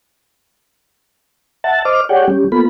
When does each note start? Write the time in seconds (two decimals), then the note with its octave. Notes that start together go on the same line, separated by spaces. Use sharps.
1.64 E5 F#5 A5 A6
1.85 C5 D#5 D6 F6
2.09 G4 G#4 C#5 D5 F#5 G5
2.27 G3 C#4 G4
2.52 A#3 B3 F4 A4 B5